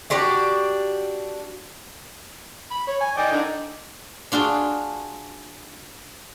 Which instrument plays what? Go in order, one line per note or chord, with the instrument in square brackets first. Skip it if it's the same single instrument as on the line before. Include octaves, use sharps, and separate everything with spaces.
[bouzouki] D4 F#4 G4 D5
[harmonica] B5
C#5
G#5
D5 D#5 G5
D3 D#4
[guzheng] D4 F4 F#4 G#4